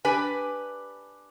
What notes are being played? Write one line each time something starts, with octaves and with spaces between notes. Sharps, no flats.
D4 G4 B4 G#5